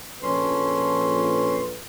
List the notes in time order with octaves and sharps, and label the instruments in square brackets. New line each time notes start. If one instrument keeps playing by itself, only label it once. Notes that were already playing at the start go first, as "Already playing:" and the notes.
[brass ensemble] A#1 A4 B4 [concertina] C#4 C6